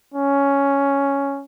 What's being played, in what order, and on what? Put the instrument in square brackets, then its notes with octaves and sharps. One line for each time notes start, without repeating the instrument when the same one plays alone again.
[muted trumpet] C#4